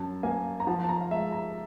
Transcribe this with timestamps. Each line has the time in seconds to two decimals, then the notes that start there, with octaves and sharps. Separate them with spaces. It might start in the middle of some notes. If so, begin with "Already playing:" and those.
Already playing: F#2 F#3 A5
0.23 A#3 G#5
0.60 A#5
0.67 F3 A5
0.84 A5
0.89 A#5
1.01 F5
1.11 G#3 E5
1.32 A#5